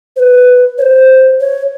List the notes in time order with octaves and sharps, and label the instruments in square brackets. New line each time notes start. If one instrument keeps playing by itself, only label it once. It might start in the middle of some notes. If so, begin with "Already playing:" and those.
[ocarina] C5
B4
C#5
C5
C#5